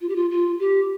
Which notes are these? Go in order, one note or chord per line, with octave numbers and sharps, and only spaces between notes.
F4
G4
F4
F4
G4